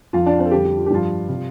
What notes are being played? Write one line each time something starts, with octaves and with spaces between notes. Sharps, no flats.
F2 F3 F4 F5
D4 D5
C4 C5
A4
F2 D3 G3 G4
G4
F4
G4
G2 F3 F4
C3 G3